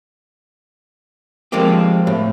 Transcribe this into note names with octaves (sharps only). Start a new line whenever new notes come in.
F3 G#3 A#3 C4 G4
A2